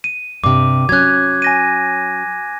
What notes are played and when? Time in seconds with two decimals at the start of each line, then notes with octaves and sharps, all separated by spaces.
0.04 D#7
0.44 G2 C3 D6
0.89 F#3 C#4 F#6 G#6
1.42 G#5 A#6 D#7